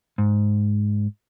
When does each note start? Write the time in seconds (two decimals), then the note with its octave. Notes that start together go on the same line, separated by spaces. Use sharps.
0.18 G#2